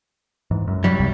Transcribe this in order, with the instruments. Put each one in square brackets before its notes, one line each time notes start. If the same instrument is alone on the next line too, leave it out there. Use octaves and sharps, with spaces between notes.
[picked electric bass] G#2 E3
F#2
[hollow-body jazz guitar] C2 F#3 G3
[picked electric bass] C#2 F#2 C3